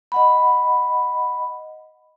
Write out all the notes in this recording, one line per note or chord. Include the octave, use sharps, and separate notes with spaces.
D#5 F#5 B5